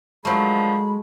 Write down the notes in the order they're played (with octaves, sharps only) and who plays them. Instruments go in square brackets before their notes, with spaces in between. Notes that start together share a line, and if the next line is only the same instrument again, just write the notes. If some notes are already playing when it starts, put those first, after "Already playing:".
[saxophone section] D3 D#3 F3 [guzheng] F#3 A3 [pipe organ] G#3 [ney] B5